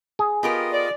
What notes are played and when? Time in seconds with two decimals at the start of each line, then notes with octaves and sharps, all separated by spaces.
0.19 G#4
0.43 B3 F4 G4 A#4 D#5
0.73 D5